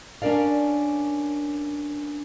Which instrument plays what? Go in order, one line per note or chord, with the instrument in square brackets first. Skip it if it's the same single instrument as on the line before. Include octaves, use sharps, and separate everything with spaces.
[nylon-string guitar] C#4 D4 A#4 D5 F5